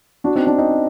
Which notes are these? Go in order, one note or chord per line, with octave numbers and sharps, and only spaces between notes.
D4 F#4
C4 D#4
D4
C4 D#4